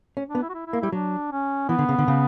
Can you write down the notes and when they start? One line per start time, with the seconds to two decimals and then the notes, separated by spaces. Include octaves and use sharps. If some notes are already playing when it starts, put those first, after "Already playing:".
0.17 C#4
0.28 D4
0.35 B3
0.42 E4
0.49 F#4
0.54 E4
0.67 E4
0.73 A#3
0.80 G3 E4
0.92 F#3 D4
1.32 C#4
1.69 E3 B3
1.78 D3
1.89 C#3
1.98 D3
2.08 C#3